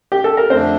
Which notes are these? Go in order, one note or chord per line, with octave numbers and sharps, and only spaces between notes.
G4
A4
A#4
F2 D3 A3 C4 D4 C5